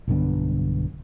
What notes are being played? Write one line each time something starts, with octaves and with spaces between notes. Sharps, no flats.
B1 G2 D3 B3